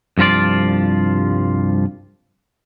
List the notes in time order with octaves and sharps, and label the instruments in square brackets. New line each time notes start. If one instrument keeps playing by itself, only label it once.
[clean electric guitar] C2 G2 F3 F4 D5